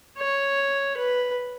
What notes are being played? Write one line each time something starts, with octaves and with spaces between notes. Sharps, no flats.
C#5
B4